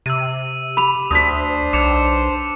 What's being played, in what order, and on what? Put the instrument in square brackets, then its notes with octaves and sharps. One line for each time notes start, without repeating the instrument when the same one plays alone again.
[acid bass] C3 [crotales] E6 D#7
[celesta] B5 [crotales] D6 F7
[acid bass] D2 [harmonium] D4 C5 [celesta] D#6 B6
[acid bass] B1 [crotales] D6 C#7 F7